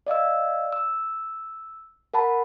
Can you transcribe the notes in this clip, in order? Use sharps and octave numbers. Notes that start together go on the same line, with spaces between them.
D5 D#5 F5 E6
E6
A#4 F#5 A5 B5